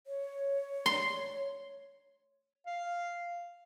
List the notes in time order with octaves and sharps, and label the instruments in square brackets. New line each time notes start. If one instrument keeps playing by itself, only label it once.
[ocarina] C#5
[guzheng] C6
[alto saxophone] F5